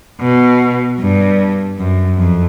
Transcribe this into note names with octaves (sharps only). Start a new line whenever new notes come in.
B2
G2
F#2
F2